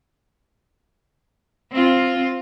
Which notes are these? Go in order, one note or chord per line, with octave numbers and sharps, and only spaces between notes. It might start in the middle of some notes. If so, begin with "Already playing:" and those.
C4 F4